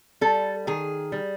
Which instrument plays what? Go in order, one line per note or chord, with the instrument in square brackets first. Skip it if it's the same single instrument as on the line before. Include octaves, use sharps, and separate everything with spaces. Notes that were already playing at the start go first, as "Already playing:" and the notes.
[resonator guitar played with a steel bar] G3 A4
D#3 G#4
G3